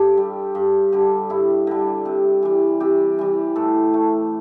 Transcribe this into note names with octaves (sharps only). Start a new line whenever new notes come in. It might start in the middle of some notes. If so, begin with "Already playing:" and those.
Already playing: G2 G4 A4
G3
G2
D3 G3
G2 E4
D3 G3
C3
E3 G3
C3 G4
E3 G3
A2 A4
A3